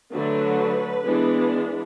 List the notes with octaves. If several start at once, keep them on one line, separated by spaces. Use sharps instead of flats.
D3 F#3 A3 D4 B4
E3 G#3 B3 D4